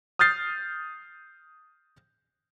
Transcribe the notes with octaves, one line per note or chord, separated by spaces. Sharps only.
D#6 F6 G6 A6 C7